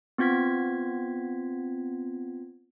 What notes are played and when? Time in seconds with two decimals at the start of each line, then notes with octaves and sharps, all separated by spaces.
0.18 B3 C4 F4 G#6 B6